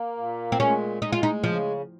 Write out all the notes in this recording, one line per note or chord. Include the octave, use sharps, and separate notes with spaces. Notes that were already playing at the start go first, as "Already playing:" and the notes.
Already playing: A#3
A#2
C4
G#3 C#4
G#3 D#4
F4
D#4
C#3 F3